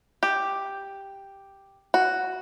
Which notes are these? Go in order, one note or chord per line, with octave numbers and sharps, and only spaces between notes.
G4
F#4